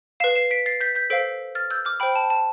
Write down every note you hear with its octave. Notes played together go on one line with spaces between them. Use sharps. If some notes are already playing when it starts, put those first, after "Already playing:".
B4 F5 C7 E7
C7 E7
B6 D7
A6 C7
G6 B6
G6 B6
A4 C5 F5 B6 D7
F6 A6
E6 G6
D6 F6
C5 G5 B5
A5
A5